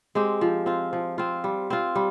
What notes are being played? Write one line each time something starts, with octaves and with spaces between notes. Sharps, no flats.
G#3 C4 G4
F3
C4 F4
F3
C4 F4
G3
C4 F4
G3